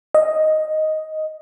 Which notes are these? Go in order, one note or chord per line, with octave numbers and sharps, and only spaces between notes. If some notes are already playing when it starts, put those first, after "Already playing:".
D#5